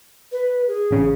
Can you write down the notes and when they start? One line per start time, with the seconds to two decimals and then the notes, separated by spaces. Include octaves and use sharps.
0.32 B4
0.67 G#4
0.91 A1 C#3